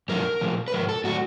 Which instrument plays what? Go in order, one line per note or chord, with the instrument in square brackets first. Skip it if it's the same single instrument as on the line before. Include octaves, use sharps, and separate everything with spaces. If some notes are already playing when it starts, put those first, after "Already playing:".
[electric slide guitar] F#2 D3 F3 A3 A#4
A#2 F3 A3
B4
G#2 F3 A#4
A4
A2 F#3 A3 F#4